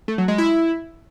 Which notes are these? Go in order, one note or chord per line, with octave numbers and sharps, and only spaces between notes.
A3
F#3
G#3
E4